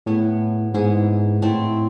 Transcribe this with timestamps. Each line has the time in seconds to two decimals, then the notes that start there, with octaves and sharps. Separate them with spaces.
0.06 A2 B3 E4 G#4
0.74 G#2 B3 E4 G#4
1.42 A2 A3 C4 E4